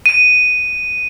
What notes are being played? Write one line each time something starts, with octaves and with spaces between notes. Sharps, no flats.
D#7